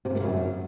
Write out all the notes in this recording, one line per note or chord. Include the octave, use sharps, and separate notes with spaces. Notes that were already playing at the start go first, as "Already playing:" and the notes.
C3
C#3
A#2
C#3
F#2